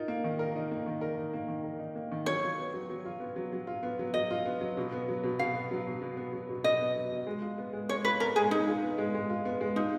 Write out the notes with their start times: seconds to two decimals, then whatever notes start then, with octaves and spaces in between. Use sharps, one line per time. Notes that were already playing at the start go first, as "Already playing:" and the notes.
Already playing: D#4 F4 A#4
0.08 A#3
0.24 D#3
0.39 A#4
0.56 D#4
0.71 A#3
0.86 D#3
1.01 A#4
1.18 D#4
1.34 A#3
1.48 D#3
1.64 A#4
1.79 D#4
1.96 A#3
2.12 D#3
2.26 F#3 C#5
2.43 F4
2.58 B3
2.74 F#3
2.90 F#3
3.05 F4
3.20 B3
3.36 F#3
3.52 F#3
3.67 F4
3.83 B3
3.99 F#3
4.14 F#3 D#5
4.31 F4
4.45 B3
4.61 F#3
4.77 B2
4.92 B3
5.08 F#3
5.23 B2
5.39 B2 F5
5.55 B3
5.71 F#3
5.87 B2
6.02 B2
6.17 B3
6.32 F#3
6.49 B2
6.64 B2 D#5
6.80 B3
6.96 F#3
7.12 B2
7.27 G#3
7.42 F4
7.58 B3
7.73 G#3
7.89 G#3 C#5
8.05 F4 B4
8.20 B3 A#4
8.36 G#3 G#4
8.51 G#3 D#4
8.67 F4
8.82 B3
8.98 G#3
9.15 G#3
9.30 F4
9.45 B3
9.61 G#3
9.76 D#4 F4